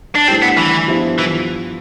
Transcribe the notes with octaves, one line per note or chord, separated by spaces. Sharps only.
D4
A2 G3 C4 D4
B3
E3
G2 F3 B3 E4
E3